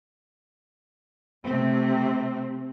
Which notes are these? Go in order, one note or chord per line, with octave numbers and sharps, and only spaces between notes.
C3 A3 C4